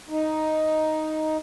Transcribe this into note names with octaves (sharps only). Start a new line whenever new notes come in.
D#4